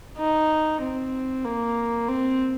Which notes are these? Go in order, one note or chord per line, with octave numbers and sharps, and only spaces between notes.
D#4
C4
A#3
C4